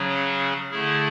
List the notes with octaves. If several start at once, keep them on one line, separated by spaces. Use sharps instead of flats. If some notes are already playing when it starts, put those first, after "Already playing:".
Already playing: C#3 F#3 C#4 G#4
D3 A3 E4 G#4